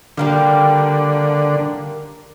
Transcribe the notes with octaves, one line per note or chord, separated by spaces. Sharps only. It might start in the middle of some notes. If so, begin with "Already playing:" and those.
D3 G3 A#3 G4